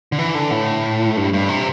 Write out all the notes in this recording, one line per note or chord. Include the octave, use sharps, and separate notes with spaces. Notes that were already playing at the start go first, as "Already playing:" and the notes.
D3
E3
D3
A2
G2
G2
C3